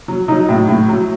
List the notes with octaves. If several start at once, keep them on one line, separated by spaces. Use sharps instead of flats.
F#3
F#3 D#4
A2
A2
F#3